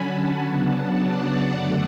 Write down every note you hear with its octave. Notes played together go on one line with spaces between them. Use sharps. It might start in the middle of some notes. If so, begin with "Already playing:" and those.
Already playing: D3 F#3 C#4 F#5 G#5 A5 B5
C#3 F#3 B3 D4
D5 F#5
F#2 D3 A3 D5 F#5